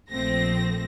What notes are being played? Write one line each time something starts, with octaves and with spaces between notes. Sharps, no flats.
A#1 F3 A3 C4 A#6